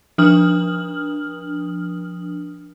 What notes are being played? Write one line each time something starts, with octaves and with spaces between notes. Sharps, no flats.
F3 D4 D#6 F6 F#7